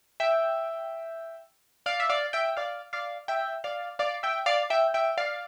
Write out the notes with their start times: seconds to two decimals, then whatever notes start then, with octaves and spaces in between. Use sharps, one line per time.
0.20 E5 G5
1.86 D5 F5
2.00 E5
2.09 D5 F5
2.33 E5 G5
2.57 D5 F5
2.93 D5 F5
3.28 E5 G5
3.64 D5 F5
3.99 D5 F5
4.23 E5 G5
4.46 D5 F5
4.70 E5 G5
4.94 E5 G5
5.18 D5 F5